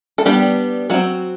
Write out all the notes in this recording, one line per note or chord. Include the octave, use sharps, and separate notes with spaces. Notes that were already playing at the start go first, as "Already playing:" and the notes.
A4
G3 B3 D4 G4
F#3 C4 F#4